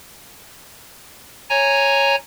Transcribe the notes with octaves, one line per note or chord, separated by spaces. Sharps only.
C#5 G#5 A#5